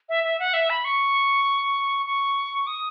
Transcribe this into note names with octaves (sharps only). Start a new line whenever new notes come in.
E5
E5
F#5
E5
B5
C#6
C#6
D#6